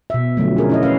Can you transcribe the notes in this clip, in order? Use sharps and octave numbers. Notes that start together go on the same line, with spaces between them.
B2 E5
D3 F3 F#3 A3
C#4 G#4 A#4
C#4 E4 D#5
C#4 B4 F5